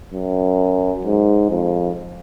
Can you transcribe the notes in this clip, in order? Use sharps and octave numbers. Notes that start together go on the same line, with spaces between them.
F#2
G#2
F2